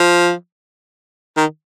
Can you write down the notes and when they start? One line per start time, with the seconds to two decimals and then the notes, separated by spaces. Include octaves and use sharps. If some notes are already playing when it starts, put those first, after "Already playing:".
Already playing: F3
1.37 D#3